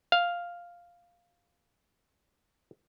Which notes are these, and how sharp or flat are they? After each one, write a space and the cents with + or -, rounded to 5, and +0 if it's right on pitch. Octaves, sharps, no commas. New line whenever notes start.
F5 +0